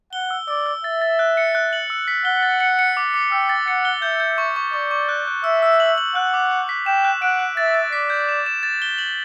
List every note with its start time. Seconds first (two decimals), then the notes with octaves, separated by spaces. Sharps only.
0.13 F#5 G7
0.31 E6
0.48 D5 E6
0.66 E6
0.84 E5 A6
1.01 A6
1.19 F#6
1.37 C#7
1.55 F#6
1.73 F#7
1.90 E6
2.08 B6
2.25 F#5 G7
2.43 A6
2.60 C#7
2.79 C#7
2.97 D6
3.14 D6
3.32 G5 E6
3.49 A6
3.68 F#5 C#7
3.85 G7
4.02 E5 G6
4.20 G6
4.38 C#6
4.56 C#6
4.73 D5 C#6
4.91 C#6
5.09 F#6
5.27 F#6
5.44 E5 E6
5.63 E6
5.80 F#7
5.98 F#7
6.15 F#5 F#6
6.34 D6
6.51 F#7
6.69 B6
6.86 G5 E7
7.05 F#6
7.22 F#5 D7
7.39 F#6
7.57 E5 A6
7.75 A6
7.93 D5 B6
8.10 G6
8.29 E7
8.46 E7
8.63 A6
8.82 G7
8.98 F#7